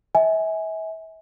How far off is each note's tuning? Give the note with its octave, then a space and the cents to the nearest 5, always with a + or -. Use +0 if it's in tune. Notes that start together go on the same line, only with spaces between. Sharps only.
E5 -35 G#5 +0